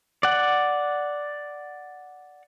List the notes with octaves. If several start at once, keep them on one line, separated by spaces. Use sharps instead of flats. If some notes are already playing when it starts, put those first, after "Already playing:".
D5 F#5